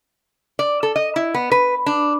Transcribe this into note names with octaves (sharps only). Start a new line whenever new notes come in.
D5
A4
D#5
E4
B3
B4
D4